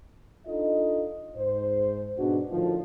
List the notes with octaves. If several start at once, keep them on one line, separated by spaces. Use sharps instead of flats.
D4 D#4 F4 A4 D#5
G#2 C5
G#2 B2 G#3 D4 F#4
A2 D3 D#3 F3